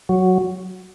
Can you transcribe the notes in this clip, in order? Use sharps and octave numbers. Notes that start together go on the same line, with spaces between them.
F#3